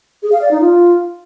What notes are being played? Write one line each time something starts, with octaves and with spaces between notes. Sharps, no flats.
G#4
F5
D5
D#4
F4